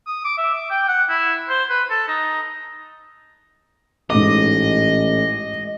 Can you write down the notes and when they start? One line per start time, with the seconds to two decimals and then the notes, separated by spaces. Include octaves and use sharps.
0.07 D#6
0.25 D6
0.38 E5
0.54 D6
0.71 G5
0.88 F#5
1.09 E4
1.49 C5
1.70 B4
1.90 A4
2.08 D#4
4.10 A1 G#2 D#5 D6